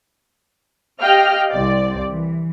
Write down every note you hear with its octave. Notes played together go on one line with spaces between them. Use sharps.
G4 D#5 F5 G5 F6
C2 C4 D5
E3